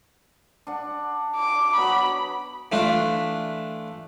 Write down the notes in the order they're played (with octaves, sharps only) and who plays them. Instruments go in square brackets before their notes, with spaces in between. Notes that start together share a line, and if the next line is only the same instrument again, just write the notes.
[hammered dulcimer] D4 F#5
[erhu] D6
[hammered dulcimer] F#3 B3 F#4 [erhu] B5
[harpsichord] E3 A3 D4 F4